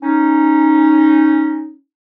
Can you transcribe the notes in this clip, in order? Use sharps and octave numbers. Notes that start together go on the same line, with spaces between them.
C#4 D#4